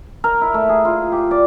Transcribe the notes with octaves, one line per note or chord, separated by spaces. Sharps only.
A#4
E4
A3
G#4
F4
G4
D5